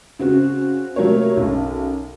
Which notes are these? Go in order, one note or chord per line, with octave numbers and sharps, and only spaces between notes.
C#3 C4 F#4
C3 F#3 A3 A#3 A#4 C#5
B1 F#2